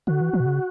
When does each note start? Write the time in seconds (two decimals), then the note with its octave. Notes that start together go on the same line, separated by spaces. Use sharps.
0.07 D3 F#4
0.21 E3
0.33 E3
0.40 B2
0.46 C#3